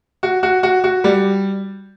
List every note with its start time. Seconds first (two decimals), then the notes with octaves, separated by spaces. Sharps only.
0.23 F#4
0.43 F#4
0.63 F#4
0.84 F#4
1.04 G3